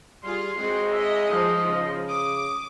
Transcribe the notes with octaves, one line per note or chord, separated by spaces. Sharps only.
G3 F4 G#4 C6
G#3 C4 F#4 G#4
D#4 D#5 E5
G#2 F3 D#5
C#3
D6 D#6